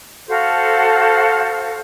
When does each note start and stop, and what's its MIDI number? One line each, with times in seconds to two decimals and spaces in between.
0.28 1.79 66
0.28 1.79 69
0.28 1.79 72
0.28 1.79 77